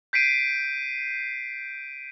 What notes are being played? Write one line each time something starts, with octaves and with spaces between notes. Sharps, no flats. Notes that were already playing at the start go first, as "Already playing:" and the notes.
G6 B6 C7 D7 D#7